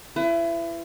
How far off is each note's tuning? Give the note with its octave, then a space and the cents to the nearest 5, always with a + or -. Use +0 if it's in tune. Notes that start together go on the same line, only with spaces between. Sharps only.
E4 +30 B4 +30